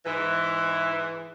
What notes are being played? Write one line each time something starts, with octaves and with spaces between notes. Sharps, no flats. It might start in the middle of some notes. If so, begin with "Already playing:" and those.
G#2 E3